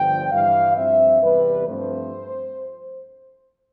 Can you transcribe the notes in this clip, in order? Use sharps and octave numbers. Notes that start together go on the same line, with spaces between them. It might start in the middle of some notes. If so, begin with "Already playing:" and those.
Already playing: G1 G2 D3 F3 G5
G2 E3 G3 F5
G2 F3 C4 E5
E2 C3 G3 B4
G2 F3 A3 C4 C5